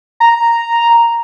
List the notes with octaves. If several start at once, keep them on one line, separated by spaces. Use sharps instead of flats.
A#5